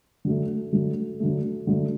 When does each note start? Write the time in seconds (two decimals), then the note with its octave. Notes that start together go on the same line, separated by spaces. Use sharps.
0.25 D3 F#3 A3
0.73 D3 F#3 A3
1.20 D3 F#3 A3
1.67 D3 F#3 A3